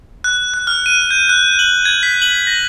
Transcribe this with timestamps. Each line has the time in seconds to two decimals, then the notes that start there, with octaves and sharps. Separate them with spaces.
0.24 F#6
0.54 F#6
0.67 F6
0.86 D#7
1.11 G6
1.29 F#6
1.59 F#7
1.85 G#6
2.03 B6
2.22 F#7
2.47 A#6